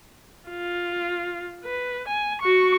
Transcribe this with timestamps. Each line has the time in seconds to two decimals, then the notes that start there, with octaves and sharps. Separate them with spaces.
0.49 F4
1.64 B4
2.08 G#5
2.41 F#4 C#6